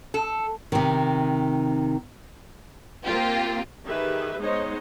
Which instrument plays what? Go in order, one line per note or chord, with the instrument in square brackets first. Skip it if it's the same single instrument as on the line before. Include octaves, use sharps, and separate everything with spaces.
[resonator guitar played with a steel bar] A4
[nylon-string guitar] C3 D#3
[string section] A#3 C4 F4 G4
[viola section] D#3 G4 G#4 B4 E5
G#3 B3 D#4 C5 C#5 D#5